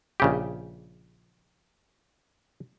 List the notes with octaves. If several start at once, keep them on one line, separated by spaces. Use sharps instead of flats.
A#1 C#3 G4